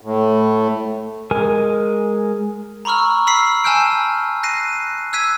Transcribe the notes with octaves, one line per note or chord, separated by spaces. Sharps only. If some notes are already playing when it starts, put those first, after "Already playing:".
A2
G#3 A#4 G#5
A#5 B5 C#6 E6 F6
B5 E6 B6 C7
G#5 A5 E6 F6 G6 D7
F#6 A#6 C7 D#7
E6 F#6 G#6 B6 D#7